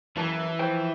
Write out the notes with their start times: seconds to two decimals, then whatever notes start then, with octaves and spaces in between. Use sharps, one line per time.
0.17 F#2 E3 A5
0.59 F3 C5 G5